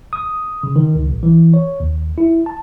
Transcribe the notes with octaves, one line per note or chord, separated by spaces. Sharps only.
D#6
C#3
D#3
C#2
A#1
E3
C#5
D#2
E4
A5